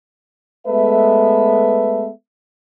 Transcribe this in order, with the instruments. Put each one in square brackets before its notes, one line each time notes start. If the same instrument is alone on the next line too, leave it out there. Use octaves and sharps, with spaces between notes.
[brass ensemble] G#3 A3 B3 A4 B4 E5